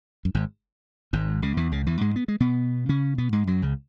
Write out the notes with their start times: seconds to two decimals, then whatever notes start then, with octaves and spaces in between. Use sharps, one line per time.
0.25 F#2
0.35 G#1 G#2
1.13 G#1 G#2
1.42 C#2 C#3
1.57 E2 E3
1.72 C#2 C#3
1.86 E2 E3
2.01 G#2 G#3
2.16 B3
2.28 G#3
2.40 B2 B3
2.89 C#3 C#4
3.18 B2 B3
3.32 G#2 G#3
3.47 F#2 F#3
3.62 C#2 C#3